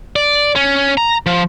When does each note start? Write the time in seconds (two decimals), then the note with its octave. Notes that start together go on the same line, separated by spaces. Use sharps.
0.16 D5
0.56 C#4
0.97 A#5
1.26 F3